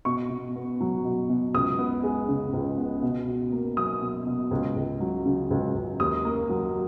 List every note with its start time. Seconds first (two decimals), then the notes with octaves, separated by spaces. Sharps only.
0.05 B2 C#6
0.30 B2
0.56 B3
0.81 F#3
1.05 B2
1.30 B2
1.54 C#2 D#6
1.79 B3
2.03 G#3
2.29 C#3
2.53 C#2
2.78 B3
3.02 B2
3.27 B2
3.52 A#3
3.77 F#3 D#6
4.01 B2
4.27 B2
4.51 C#2
4.76 C#2
5.00 F#3
5.25 C#3
5.51 C#2
5.74 C#2
6.00 D#2 D#6
6.25 A#3
6.50 F#3